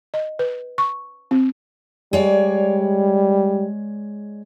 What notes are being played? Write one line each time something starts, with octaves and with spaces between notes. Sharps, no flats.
D#5
B4
C#6
C4
G3 G#3 C#5 D5